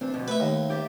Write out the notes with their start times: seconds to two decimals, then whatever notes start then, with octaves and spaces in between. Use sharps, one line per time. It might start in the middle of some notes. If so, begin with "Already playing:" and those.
0.01 E2 C4 D4
0.14 F2 B2 D3
0.28 A3 B4 E5
0.40 D#2
0.70 G4 D5 E5